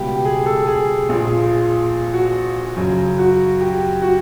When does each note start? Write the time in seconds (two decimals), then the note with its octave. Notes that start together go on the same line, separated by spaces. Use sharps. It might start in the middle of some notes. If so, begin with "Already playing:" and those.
Already playing: C#2 B2 G3 B3 G4
0.25 G#4
0.46 A4
0.67 G#4
1.09 A#1 A#2 F3 G#4
1.29 F4
2.13 F#4
2.76 F#2 C#3 F#3
3.18 F#4
3.61 G4
4.02 F#4